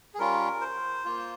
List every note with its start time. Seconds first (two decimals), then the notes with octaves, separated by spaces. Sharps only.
0.14 G#4
0.19 G3 C#4 F4 A#4
0.61 C5
1.05 A#3 F4